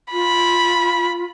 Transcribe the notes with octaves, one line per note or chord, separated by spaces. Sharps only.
F4 B5